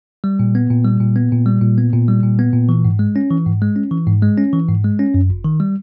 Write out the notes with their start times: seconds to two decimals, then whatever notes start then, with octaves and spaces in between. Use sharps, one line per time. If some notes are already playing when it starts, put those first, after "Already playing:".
0.24 G3
0.39 A#2
0.55 B3
0.70 A#2
0.85 G3
1.00 A#2
1.16 B3
1.32 A#2
1.46 G3
1.61 A#2
1.78 B3
1.93 A#2
2.08 G3
2.23 A#2
2.39 B3
2.53 A#2
2.69 E3
2.85 G#2
2.99 G#3
3.16 C#4
3.30 E3
3.46 G#2
3.62 G#3
3.76 C#4
3.91 E3
4.07 G#2
4.22 G#3
4.38 C#4
4.53 E3
4.69 G#2
4.84 G#3
4.99 C#4
5.14 F#2
5.30 G1
5.44 D#3
5.60 G3